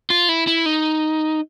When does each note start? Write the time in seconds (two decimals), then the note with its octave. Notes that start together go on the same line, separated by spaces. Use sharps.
0.10 F4
0.29 E4
0.47 E4
0.66 D#4